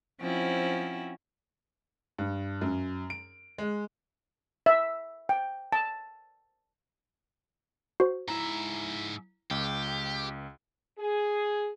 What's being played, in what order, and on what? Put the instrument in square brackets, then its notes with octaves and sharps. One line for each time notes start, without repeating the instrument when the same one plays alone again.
[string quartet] F3 C4 C#4 E4 F#4
[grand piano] G2
F#2
D7
G#3
[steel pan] E5
G5
A5
[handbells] F#4 C5
[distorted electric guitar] G#2 E5 [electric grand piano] E4 A#5
[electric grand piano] C#2 [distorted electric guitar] G4
[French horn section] G#4